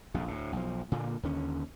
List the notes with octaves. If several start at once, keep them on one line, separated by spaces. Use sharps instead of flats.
A#1 F2 C3
D2 A2
B1 F3
A#2 D3 A#3
D#2 D3 C#4